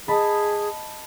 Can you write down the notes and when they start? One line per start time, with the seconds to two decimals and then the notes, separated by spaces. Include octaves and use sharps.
0.08 G#4 D#5 A5 B5